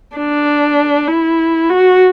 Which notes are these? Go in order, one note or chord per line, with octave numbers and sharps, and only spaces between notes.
D4
E4
F#4